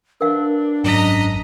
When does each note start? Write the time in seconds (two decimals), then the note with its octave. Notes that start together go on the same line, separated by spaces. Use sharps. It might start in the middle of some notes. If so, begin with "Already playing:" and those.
0.21 D4 A#4 B4 F5
0.84 G#1 F#2 D#5 A#5 B6